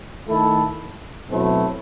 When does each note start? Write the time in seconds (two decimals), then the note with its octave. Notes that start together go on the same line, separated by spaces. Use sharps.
0.27 D#3 A3 E4 A4
1.29 B2 F#3 A3 C4 E4